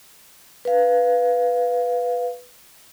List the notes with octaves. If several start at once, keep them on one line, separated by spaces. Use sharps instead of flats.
B4 F5